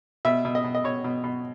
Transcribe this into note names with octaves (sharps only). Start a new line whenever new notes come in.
B2 E5
B2
D#5
B2
D#5
B2 C#5
B2
B2